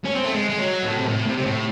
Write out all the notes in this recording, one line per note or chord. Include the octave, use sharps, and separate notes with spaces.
C#4
C4
A3
G#3
G#3
F#3
A2
C3
A2
C3
C3
A2